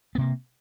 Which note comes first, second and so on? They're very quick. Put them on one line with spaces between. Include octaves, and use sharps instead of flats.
B3 C3 A#3